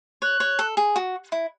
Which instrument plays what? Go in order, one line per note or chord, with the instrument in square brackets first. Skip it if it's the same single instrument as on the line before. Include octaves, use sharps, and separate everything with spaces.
[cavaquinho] C#5 [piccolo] F#6
[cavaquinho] C#5
A4
G#4
F#4
E4